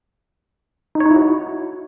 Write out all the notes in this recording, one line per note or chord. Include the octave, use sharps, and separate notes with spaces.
D#4
C#5
D#4
E4
F#4